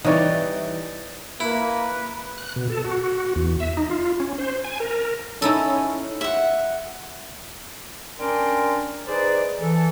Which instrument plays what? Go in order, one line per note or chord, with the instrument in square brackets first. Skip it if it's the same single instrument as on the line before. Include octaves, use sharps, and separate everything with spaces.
[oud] E3 G3 [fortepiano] D#4 C#5 D5
[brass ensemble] A#3 [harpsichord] E4 [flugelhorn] B4
[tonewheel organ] F#6
B2
A4
F#4
E2
E5
D#4
F4
C#4
C5
G#5
A#4
[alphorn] C#4 [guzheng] D#4 E4 A4
[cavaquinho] E5 F#5
[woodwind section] C#4 D4 A#4 D5 G5 C6
D#4 G#4 B4 C5 D5
E3 A4